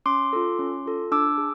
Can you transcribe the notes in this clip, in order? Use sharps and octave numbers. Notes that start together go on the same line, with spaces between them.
C#4 C6 D6
F4 A4
C#4
F4 A4
D4 D6 E6
G#4